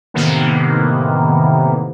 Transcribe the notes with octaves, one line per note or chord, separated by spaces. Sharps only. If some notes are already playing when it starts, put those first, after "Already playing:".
A2 C3 D#3 E3 A#3 B3